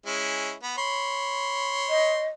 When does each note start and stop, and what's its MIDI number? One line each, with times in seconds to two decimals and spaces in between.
0.06 0.54 56
0.06 0.54 61
0.06 0.54 64
0.63 0.73 59
0.78 2.30 73
0.78 2.30 83
0.78 2.30 84
1.90 2.28 75